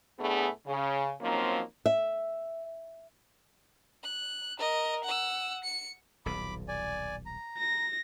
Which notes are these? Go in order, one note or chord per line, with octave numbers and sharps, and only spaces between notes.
A2 A3 B3 D4 G#4
C#3
F3 F#3 A#3 C4 C#4 D#4
E5
F#6
A#4 D#5
F#5 E6
C#7
D#1 B1 B2 B5 D6
D5 G#5
A#5
A#6